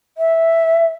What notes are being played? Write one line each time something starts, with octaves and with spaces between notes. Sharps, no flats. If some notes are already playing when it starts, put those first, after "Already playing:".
E5